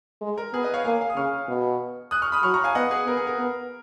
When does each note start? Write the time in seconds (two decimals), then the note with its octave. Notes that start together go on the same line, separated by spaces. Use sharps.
0.21 G#3
0.38 A#4
0.53 B3 G#4
0.63 B4 D#5
0.74 C#5 F5
0.85 A#3 F5 G#5
1.01 F5 G#5
1.10 D#6
1.16 C#3 C#6 F6
1.48 B2
2.11 D#6 F#6
2.22 C#6 F6
2.32 B5 D#6
2.43 F#3 C#6 F6
2.54 A#5 C#6
2.64 F5 G#5
2.75 B3 D#5 F#5
2.91 G#4 B4
3.06 B3 A#4
3.17 G#4
3.27 A#4
3.39 B3